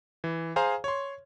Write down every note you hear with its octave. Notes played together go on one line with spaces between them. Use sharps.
E3
G#4 C5 F5 G#5 A#5
C#5 C6